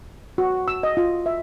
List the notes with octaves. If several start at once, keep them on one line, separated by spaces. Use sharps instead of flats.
F#4
E6
D#5
F4
E5